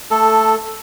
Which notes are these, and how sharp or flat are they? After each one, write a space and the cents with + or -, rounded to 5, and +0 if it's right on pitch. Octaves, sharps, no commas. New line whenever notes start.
A3 +15 A4 +0